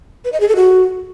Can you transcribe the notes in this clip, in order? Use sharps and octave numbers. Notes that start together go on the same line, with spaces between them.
B4
D#5
G#4
A4
F#4